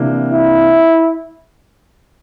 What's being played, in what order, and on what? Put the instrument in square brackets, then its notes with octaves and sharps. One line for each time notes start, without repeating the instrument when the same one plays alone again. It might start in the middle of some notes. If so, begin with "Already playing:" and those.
Already playing: [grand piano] C3 E3 A#3 D4
[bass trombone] E4